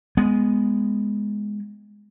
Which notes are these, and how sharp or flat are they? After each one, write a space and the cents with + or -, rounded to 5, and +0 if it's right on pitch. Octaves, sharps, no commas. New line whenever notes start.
G#3 +0 B3 +0